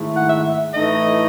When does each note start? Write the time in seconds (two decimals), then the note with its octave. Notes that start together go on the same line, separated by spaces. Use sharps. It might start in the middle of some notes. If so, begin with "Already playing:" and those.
Already playing: G#2 D#3 A3 E4
0.16 F#5
0.28 E5
0.74 A2 E3 A3 D#4 D#5